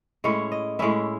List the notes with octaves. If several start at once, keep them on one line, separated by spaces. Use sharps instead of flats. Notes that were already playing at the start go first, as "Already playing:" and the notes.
A2 G#3 C#4 E4 C#5
D#5
A2 G#3 C#4 E4 E5